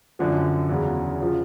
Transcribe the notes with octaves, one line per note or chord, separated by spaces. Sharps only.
F#2 D3 F3
E2 C#3 F#3
C#3 F3